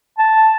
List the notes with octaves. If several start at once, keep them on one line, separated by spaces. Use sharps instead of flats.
A5